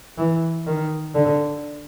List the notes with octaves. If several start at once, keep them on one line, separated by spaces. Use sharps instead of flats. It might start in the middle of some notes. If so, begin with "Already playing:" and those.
E3
D#3
D3